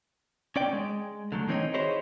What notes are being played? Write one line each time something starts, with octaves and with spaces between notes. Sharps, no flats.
C#4 D5 G5
G#3
D3 F#3 A3
D#3 E3 C4 D#4 C#5 D#5
E4 F#4 G#4 C5 C#5 D#5